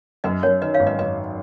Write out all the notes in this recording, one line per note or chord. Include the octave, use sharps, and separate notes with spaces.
F#2 B4 D#5
F#2 A#4 C#5
D#3 B4 D#5
C#5 F5
G#1
B4 D#5
F#2 B4 D#5